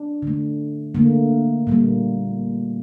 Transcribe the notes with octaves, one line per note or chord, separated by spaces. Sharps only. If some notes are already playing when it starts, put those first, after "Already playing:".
Already playing: D4
D3 A3
D3 A3 A#3
A#2 G3 A#3